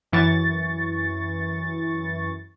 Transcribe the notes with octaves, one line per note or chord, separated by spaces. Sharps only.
F#2 E3 C#6 A6